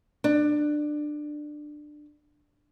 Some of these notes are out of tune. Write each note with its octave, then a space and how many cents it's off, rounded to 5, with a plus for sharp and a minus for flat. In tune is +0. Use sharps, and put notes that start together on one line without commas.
D4 +20